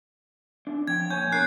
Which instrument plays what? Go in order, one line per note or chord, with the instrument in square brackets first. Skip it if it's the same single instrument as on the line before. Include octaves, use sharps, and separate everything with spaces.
[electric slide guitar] C4 D4
[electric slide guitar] F3 G5 [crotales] G#6
[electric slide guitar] A#2 C#5 G#5 [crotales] G6
[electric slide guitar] B2 D4 A#4 [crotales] F#6 C7